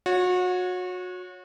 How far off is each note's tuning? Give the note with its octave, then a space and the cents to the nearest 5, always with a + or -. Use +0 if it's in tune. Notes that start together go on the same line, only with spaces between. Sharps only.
F#4 -30 C#5 +0